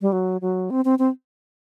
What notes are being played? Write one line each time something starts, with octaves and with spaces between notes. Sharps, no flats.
G3
F#3
F#3
C4
C4
C4